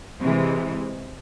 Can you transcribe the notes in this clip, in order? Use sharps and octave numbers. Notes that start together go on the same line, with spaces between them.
C3 E3 G#3